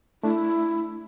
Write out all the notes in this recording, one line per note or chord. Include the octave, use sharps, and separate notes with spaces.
A3 D4 E4